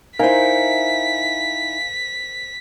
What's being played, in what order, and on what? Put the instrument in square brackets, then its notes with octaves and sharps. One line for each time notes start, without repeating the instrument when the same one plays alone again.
[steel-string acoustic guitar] D#4 E4 [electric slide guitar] A#4 C5 [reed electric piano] F5 G#5 [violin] B6